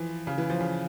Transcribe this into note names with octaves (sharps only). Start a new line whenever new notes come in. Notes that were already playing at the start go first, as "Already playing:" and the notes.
Already playing: E3 F3
C#3
E3
F3
C#3